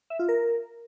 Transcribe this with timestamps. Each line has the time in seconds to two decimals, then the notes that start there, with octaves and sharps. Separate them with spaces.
0.10 E5
0.19 F4
0.29 A#4